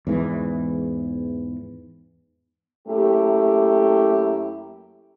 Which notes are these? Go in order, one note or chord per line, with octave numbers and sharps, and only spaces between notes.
E2 G#2 E3
F#2 A3 A#3 E4 G4